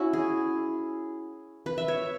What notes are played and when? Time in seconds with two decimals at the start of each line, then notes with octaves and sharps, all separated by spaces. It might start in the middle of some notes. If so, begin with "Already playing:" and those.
Already playing: C#4 E4 F#4
0.13 G#4
1.66 B4
1.78 E5
1.88 C#5